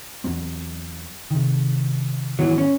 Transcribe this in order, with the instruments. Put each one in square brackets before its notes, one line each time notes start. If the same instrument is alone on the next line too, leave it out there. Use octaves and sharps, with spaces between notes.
[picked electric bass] E2 F#3 C4
C3 D#3
[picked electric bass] G#2 D#3 B3 [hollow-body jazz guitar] E3 F#3
[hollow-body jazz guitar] C#4